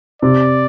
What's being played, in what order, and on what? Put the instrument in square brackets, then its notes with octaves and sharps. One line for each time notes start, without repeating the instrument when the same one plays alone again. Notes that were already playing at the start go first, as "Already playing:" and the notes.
[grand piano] C3 [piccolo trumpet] D5